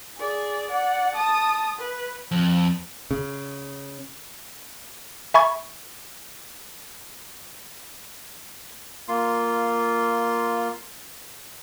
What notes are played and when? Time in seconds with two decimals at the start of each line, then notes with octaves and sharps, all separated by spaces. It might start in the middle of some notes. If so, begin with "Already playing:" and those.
0.18 G#4 D5
0.70 D5 F#5
1.16 A5 D#6
1.79 B4
2.31 F2
3.11 C#3
5.34 E5 G#5 B5 C#6 G#6
9.08 A#3 F4 C6